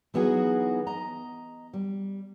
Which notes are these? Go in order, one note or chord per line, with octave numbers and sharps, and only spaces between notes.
E3 F#3 B3 D#4 F#4 G#4
D#5 A#5
G3